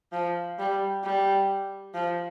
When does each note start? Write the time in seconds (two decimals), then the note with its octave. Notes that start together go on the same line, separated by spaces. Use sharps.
0.12 F3
0.59 G3
1.04 G3
1.95 F3